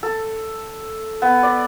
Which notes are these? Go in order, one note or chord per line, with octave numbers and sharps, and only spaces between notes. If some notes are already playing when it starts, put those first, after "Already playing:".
A4
B3
D5